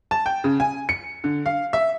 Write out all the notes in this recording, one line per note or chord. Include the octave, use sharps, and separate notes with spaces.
A5
G5
C#3
G#5
C#7
D3
F5
E5